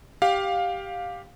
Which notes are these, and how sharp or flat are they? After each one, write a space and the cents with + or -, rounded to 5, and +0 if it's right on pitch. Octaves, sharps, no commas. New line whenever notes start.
G4 +0 F5 +15